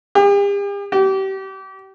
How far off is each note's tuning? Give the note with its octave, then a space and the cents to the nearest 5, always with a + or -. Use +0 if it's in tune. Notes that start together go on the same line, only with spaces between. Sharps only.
G4 +45
G4 -30